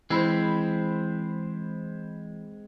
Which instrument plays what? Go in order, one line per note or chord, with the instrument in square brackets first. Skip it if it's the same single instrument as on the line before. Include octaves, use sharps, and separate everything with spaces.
[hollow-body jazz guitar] E3 [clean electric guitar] G#3 C4 [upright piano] C5 B5 E6